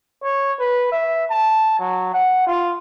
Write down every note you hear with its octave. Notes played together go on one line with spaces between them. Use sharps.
C#5
B4
E5
A5
F#3
F#5
F4